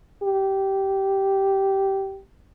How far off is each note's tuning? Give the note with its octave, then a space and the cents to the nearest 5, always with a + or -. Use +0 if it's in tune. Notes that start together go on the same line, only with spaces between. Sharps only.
G4 -15